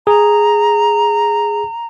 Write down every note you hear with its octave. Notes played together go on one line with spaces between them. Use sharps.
G#4 A#5